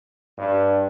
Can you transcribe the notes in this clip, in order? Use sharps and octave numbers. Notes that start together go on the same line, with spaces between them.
G2